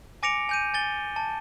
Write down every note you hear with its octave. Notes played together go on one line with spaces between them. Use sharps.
G#5 D6 A#6 C#7 D7 F7
G#5 G6 D#7
G#5 A6 G7
A5